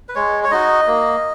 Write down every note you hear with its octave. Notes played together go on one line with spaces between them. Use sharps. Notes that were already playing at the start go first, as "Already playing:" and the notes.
B4
G#3 C#5
C#5
D#4 F#4 D#5
A#3